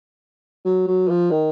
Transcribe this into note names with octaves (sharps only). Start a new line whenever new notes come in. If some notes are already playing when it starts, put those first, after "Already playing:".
F#3
F#3
F3
D#3